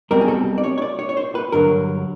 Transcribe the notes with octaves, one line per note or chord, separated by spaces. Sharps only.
B1 B2 G3 C4 A#4
G#4
A4
D5
C#5
C#5
D5
C#5
C#5
C5
B4
G2 D3 F#3 A#4